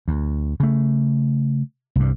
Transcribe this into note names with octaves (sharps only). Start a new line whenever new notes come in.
D2
C#3 A3
C2 G2